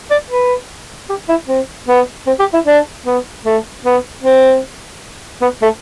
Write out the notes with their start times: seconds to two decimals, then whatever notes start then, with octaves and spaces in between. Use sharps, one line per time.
0.11 D5
0.30 B4
1.09 G4
1.29 E4
1.48 C4
1.88 B3
2.27 C4
2.39 G4
2.53 E4
2.66 D4
3.06 B3
3.45 A3
3.85 B3
4.23 C4
5.42 B3
5.62 A3